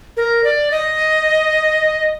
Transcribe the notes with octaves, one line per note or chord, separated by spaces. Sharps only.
A#4
D5
D#5